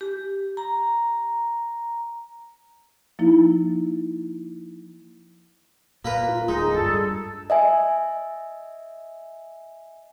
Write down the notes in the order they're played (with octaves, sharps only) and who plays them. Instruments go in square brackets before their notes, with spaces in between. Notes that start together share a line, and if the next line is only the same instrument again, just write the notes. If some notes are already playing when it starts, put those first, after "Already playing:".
[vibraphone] G4
A#5
[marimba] F3 A#3 D#4 E4
[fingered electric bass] A#2 [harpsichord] A#3 A#4 B4
[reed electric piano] F4
[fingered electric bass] D1 [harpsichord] G#3 [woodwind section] D#4
[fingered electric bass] G2 [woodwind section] G#4 A4
[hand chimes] D#5 E5 G#5